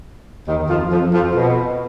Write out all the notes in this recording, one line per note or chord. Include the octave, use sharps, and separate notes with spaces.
D#2 D#3
F2 F3
F2 F3
F2 F3
B2